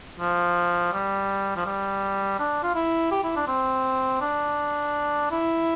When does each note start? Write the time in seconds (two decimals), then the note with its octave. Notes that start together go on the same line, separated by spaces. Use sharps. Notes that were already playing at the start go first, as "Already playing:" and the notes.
0.19 F3
0.92 G3
1.57 F3
1.66 G3
2.39 D4
2.63 F4
2.75 E4
3.11 G4
3.23 E4
3.36 D4
3.48 C4
4.21 D4
5.31 E4